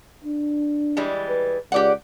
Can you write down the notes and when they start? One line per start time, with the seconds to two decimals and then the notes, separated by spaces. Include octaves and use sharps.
0.24 D4
0.97 E3 G3 G#3
1.28 B4
1.72 C#2 G4 D5 F#5